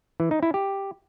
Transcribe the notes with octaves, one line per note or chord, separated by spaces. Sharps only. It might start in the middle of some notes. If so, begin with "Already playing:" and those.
E3
D#4
E4
G4